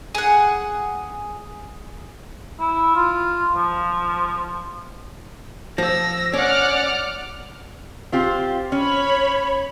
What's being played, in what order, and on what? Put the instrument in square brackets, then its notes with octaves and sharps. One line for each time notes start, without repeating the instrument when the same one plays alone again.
[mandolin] G#4 F#5
[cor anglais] E4
F4
F3
[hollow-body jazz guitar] F3 [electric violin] E6 A#6
[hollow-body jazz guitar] C#4 [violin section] D5 F6 [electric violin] F#5 D6
[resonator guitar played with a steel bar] C4 F4 G4
[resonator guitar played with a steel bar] C#4 [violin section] C#5 B5